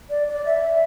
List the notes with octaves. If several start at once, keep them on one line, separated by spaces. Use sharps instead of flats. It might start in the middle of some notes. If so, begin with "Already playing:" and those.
D5
D5
E5